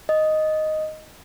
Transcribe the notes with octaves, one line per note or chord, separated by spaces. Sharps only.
D#5